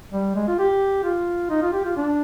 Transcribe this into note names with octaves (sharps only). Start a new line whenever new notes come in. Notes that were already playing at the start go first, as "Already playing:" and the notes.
G3
G#3
F4
G4
F4
D#4
F4
G4
F4
D4